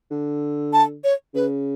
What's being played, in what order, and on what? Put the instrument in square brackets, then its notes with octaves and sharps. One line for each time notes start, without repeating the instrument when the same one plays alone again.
[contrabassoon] D3
[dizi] A5
C#5
[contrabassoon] C#3 [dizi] B4